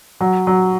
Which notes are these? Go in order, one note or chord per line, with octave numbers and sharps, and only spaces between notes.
F#3
F#3